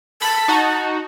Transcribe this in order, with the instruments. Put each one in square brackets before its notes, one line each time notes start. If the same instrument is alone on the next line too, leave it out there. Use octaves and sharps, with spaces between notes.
[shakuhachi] A5 [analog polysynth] B5
[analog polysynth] D#4 F#4